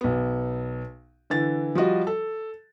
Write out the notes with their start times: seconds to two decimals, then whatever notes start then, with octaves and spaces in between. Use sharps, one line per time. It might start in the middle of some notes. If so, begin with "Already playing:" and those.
0.01 B1 B3
1.30 D3 E3 A6
1.75 F3 G3 F#4 D#5
2.07 A4